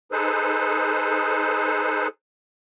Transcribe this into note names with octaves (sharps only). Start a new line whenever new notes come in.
D#4 G#4 A4 B4 C5